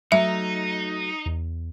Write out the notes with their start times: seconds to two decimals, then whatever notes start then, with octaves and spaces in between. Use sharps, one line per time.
0.12 F#3 A3 D#4 E5
1.26 E2